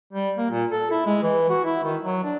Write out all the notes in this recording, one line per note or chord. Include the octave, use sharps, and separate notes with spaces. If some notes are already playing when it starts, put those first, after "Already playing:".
G3
A#3
A#2
A4
E4
G#3
E3
F#4
E4
D#3
F#3
D4